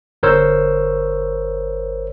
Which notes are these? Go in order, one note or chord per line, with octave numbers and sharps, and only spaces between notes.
G1 A#4 C5 C#5 E6